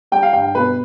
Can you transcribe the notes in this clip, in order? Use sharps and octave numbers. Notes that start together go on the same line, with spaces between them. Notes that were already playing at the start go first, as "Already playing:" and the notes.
G3 G5
F5
G2 G5
B2 B4